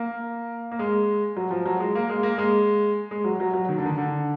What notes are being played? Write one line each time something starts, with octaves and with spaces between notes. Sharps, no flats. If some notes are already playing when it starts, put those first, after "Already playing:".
Already playing: A#3
A#3
G#3
F#3
F3
F#3
G#3
A#3
G#3
A#3
G#3
G#3
F#3
F#3
F#3
D#3
D3
D#3
D3